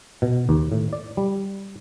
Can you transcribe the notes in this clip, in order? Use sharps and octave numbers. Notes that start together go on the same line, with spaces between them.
B2
D#2
A2
D5
G3